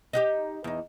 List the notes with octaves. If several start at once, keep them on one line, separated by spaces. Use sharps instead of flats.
D#4 F#4 G4
E2 D#4